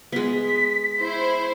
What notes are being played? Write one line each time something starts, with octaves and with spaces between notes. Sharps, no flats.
G#3 B3 B6
E4 C5